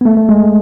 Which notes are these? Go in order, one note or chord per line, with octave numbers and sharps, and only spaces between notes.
B3
A3
A3
G#3